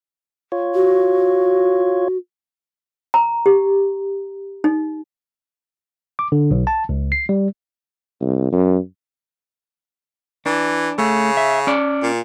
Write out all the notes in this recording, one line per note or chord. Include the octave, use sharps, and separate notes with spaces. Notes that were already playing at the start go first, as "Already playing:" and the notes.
F4 C#5
F#4
A#5
G4
D#4
D6
D3
B1
A5
C#2
C7
G3
C2
F#2
E3 D4
C#3 A3
E5
C#4 D5
A#2